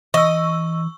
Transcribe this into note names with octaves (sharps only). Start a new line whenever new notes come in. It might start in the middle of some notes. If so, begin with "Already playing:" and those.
E3 D#5 C#6 E6